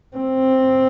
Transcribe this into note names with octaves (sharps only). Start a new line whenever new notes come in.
C4